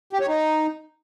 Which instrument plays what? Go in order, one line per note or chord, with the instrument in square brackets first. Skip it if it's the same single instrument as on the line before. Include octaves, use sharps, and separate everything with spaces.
[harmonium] G4
C#5
D#4